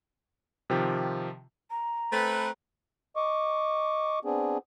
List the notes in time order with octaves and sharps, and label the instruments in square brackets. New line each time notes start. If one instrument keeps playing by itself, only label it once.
[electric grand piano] C3 D#3 F3 G4
[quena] A#5
[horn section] A3 C4 B4
[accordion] D#5 C#6 D6
B3 C4 D4 G#4